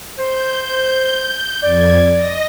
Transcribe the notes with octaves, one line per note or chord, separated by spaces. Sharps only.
C5 G6
F2 D5 G#6
D#5 A#6